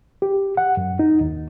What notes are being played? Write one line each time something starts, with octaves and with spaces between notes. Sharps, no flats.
G4
F#5
F#2
D#4
D#2